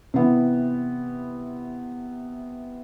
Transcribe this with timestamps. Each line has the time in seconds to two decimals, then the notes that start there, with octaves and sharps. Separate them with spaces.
0.14 C3 E3 B3